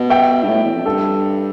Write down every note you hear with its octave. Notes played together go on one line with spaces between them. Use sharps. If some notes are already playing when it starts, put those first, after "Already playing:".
Already playing: B2
E5 G5
G2
A2
E2
F2
G2 A4